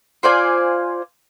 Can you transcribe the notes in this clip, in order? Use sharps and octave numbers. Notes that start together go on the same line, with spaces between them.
F4 C5 D5 G#5